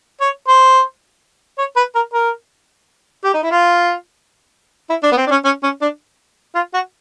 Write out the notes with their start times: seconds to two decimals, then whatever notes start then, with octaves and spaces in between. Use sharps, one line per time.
0.21 C#5
0.48 C5
1.58 C#5
1.77 B4
1.95 A#4
2.13 A#4
3.24 G4
3.34 D#4
3.43 E4
3.51 F4
4.90 E4
5.03 D4
5.12 B3
5.17 C4
5.27 D4
5.31 C#4
5.45 C#4
5.63 C#4
5.81 D4
6.55 F4
6.74 F#4